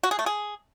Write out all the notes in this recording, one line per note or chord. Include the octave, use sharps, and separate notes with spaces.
F#4
G#4
A3
G#4